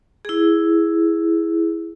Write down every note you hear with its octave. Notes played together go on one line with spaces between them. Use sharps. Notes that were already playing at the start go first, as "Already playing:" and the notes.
E4 G#4